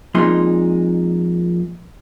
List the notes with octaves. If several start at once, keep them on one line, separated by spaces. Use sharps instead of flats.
F2 A#2 G#3 D#4 C6